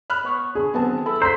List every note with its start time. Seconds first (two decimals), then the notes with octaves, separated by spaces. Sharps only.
0.10 B5 F6 F#6
0.24 B3 C#5
0.55 D3 G#4
0.74 D#2 D3 F#3 B3 C4 A5
1.06 E4 A4
1.22 C5 A#5 B6